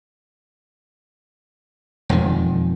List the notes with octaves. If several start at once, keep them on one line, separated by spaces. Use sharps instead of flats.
E1 F2 D#3